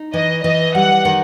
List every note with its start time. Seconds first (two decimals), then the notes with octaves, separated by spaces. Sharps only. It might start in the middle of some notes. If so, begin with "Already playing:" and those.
Already playing: D#4
0.14 E3 D#5
0.44 E3 D#5
0.75 G3 F#5
1.05 D#3